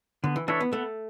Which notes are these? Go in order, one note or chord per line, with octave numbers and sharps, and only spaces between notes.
D3 B3
E3
E3 D4 A4 C#5 E5
B3
A3 B3